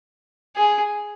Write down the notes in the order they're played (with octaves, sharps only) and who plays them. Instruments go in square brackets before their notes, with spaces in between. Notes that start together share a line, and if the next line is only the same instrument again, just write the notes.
[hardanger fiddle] G#4